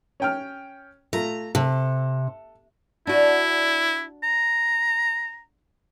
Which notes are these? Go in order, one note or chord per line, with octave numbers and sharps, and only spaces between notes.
C#4 G5 F6
A3 F4 A#5
C3 A4
D4 E4 F#4
A#5